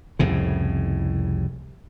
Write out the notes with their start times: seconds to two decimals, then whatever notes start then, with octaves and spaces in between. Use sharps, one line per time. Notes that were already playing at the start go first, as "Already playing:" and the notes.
0.19 C2 F2 A2 C#3